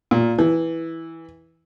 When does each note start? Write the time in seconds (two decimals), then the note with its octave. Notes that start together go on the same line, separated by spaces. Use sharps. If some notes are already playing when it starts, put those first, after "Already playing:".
0.11 A#2
0.39 E3